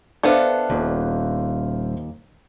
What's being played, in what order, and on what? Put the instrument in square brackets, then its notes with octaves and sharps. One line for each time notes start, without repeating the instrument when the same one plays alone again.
[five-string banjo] B3 D4 A4 [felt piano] C5 E5 F5
[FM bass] D#1 [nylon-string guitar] D#2